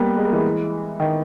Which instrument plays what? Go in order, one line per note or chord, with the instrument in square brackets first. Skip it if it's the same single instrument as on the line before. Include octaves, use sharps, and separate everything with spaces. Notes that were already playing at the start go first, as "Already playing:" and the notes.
Already playing: [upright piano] G3 A#3 B3
G#3
A#3
E3 G#3
D#3